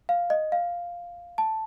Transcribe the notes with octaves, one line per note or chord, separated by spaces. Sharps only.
F5
D#5
F5
A5